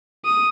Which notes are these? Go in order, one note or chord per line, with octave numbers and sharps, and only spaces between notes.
D#6